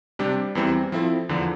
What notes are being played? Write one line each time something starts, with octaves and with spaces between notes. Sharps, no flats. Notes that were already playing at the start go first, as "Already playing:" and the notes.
C3 G3 D4 G4
E2 E3 G3 C4
F3 C4 E4 A4
E2 D3 F3